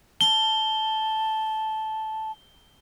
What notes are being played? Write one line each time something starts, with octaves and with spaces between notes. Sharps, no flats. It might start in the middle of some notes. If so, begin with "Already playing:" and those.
A5 G7